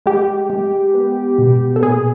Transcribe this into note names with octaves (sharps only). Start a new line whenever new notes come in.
G#3 G4
G#3
B3
B2
A4
A#2 G#4